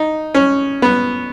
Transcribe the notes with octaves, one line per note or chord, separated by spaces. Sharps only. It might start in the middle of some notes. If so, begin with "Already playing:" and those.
Already playing: D#4
C#4
B3